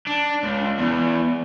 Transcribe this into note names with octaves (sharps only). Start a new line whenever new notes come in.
D4
C#2
E2